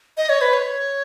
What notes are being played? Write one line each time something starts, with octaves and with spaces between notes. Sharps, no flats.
D#5
C#5
B4
C#5